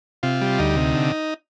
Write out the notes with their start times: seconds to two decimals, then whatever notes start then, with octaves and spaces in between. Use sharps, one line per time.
0.23 C3 F4
0.41 G3
0.59 D2 D#4
0.76 C3
0.95 D3